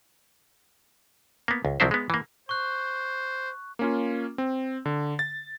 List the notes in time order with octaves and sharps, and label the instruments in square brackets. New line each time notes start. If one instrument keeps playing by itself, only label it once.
[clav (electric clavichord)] A#3 B3
C#2
C2 F3 F#3 C4 E4 C5
G#3 B3
E3 A#3
[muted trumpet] C5 [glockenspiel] C#6 F#6
[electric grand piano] A#3 C#4 F4
C4
D3
A6